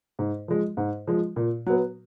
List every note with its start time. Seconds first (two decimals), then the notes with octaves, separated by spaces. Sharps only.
0.19 G#2
0.48 F3 G#3
0.77 G#2
1.07 F3 G#3
1.36 A#2
1.66 F#3 B3